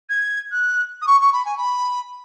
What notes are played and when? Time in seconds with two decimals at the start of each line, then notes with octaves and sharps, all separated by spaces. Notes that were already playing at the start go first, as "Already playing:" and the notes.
0.10 G#6
0.52 F#6
1.02 D#6
1.07 C#6
1.21 C#6
1.33 B5
1.45 G#5
1.57 B5